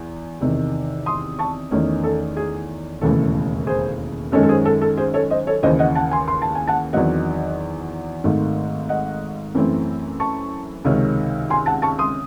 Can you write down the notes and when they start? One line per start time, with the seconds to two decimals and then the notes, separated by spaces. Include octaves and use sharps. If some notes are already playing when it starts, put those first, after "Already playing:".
Already playing: E2
0.41 E2 C3 D#3
1.06 C6 D#6
1.39 A5 C#6
1.71 E2 D#3 A3 C#4
2.04 A4
2.37 G#4
3.01 E1 D#2 C#3 E3 A3 A4
3.67 G#4 C5
4.32 F#2 D#3 G#3 C#4 A4 C#5
4.43 A4
4.49 G#4 C5
4.65 A4
4.81 A4
4.97 G#4 C5
5.14 A4 C#5
5.30 C5 D#5
5.47 A4 C#5
5.63 D#2 C#3 E3 C5 D#5
5.79 D#5 F#5
5.95 F#5 A5
6.11 G#5 C6
6.28 C6
6.42 A5
6.55 G#5
6.67 F#5 A5
6.93 E2 D#3 F#3 C4 D#5 F#5
8.24 G#1 G#2 D#3 A3
8.89 D#5 F#5
9.55 F#2 E3 A3 C4
10.20 A5 C#6
10.85 C#2 C3 D#3 G#3 C#4
11.50 G#5 C6
11.66 F#5 A5
11.82 A5 C#6
11.98 C6 D#6